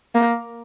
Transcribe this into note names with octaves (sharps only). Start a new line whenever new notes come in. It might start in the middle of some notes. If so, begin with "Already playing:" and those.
A#3